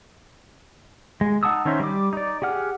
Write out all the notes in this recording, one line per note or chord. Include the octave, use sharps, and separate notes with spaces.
G#3
D#4 F#5 A5 D#6 E6
D#3 C#4 D#4 C5 E5
G3 D6
D#4 D5
G4 G#4 F#5 F6